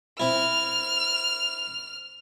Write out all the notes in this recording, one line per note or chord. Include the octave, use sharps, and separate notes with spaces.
C4 E4 F6